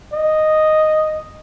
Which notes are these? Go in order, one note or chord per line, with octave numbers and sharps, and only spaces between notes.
D#5